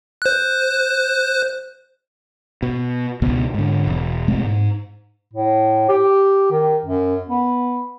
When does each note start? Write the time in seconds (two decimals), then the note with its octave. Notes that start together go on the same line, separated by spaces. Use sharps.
0.22 C5 F#6
2.63 B2
3.22 C#2 B2 B3
3.54 G#2 D3
3.87 E1
4.28 B2 G#3 A3 C4
4.44 G#2
5.33 A2
5.89 G4
6.51 D#3
6.86 F#2
7.29 B3